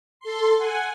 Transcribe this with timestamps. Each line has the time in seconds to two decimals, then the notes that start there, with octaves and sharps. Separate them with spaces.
0.20 A4 C6
0.57 F#5 G#5